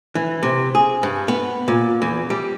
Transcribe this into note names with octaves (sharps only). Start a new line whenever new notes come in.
E3
C3
G#4
G2
B3
A#2
E2
G3